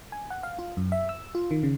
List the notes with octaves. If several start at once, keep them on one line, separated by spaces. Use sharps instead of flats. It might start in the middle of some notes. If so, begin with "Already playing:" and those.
G#5
F#5
F5
F4
F#2
E5
E6
F4
D#3
C#3